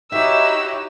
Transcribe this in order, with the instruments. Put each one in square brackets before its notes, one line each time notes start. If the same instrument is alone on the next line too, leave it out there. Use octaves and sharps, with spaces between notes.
[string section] D#4 E4 [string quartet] F#4 G4 C#5 [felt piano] E5 [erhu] E6